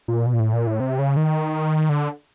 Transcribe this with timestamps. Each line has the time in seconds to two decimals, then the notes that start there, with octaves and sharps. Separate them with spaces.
0.08 A#2
0.26 B2
0.33 A#2
0.40 A2
0.53 A#2
0.67 A2
0.80 C3
0.99 C#3
1.17 D#3
1.89 D3